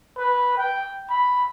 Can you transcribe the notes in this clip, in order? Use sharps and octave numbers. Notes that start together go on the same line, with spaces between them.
B4
G5
B5